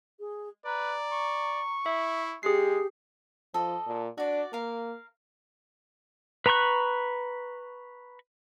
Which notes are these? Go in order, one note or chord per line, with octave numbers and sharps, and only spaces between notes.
G#4
B4 D5 A#5
C#6
E4 E5
G#3 G4 G#4 C7
F3 A4 D#5
A#2
D4 F#4 D5
A#3 A#4 F5
B4 A#5 B5 C#6 F#6